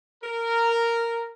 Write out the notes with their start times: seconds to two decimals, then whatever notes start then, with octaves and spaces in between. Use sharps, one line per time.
0.24 A#4